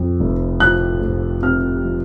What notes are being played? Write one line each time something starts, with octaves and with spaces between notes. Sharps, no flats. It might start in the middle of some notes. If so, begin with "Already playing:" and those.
Already playing: F2 C3 F3
F1
F3 F#6
F1
C3 F6
F3